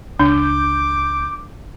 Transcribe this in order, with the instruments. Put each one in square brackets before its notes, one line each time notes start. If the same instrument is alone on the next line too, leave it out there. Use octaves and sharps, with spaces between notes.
[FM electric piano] C#2 G6 [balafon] D4 [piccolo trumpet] D6